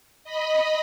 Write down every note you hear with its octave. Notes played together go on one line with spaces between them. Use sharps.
D#5 B5